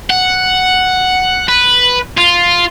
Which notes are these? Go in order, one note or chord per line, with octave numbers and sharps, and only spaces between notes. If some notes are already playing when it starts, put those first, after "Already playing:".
F#5
B4
F4